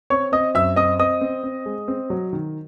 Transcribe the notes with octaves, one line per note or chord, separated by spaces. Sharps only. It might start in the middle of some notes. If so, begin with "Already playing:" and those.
C4 C#5 C#6
C4 D#5 D#6
F#2 E5 E6
C4 D#5 D#6
C4 D#5 D#6
C4
C4
G#3
C4
F#3
D#3